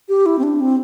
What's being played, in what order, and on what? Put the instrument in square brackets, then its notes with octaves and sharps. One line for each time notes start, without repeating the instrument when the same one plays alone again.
[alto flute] G4
E4
C4
D4
C4